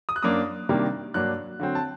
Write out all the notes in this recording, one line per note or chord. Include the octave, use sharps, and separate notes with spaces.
D#6
F#6
F#2 F#3 A#3 D4 D#6
C3 D#3 G3 A#3 D4
G2 F#3 A#3 D4 F#6
D3 F#3 C4
A5